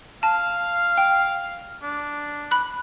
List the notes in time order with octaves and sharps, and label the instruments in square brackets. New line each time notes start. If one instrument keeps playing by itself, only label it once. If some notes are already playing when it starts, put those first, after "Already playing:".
[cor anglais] F5 [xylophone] A5
[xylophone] G5
[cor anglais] D4
[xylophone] B5 F#6